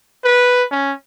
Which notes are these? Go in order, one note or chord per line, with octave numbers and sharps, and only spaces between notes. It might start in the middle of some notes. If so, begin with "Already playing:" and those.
B4
C#4